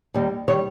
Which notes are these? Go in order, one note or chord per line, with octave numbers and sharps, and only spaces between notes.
D#2 D#3 G3
D#3 G3 C#5